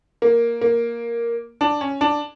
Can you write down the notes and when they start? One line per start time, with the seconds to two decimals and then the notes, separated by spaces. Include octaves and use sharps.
0.22 A#3
0.61 A#3
1.61 D4
1.81 C#4
2.01 D4